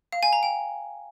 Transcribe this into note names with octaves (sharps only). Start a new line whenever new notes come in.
F5
G#5
A#5
G5